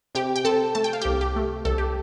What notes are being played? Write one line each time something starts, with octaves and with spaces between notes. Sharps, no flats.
C3 G4 G5
G5
C4 A4 A5
A3 A5
G5
F5
C2 G4 G5
G4
A3
C2 A4
G4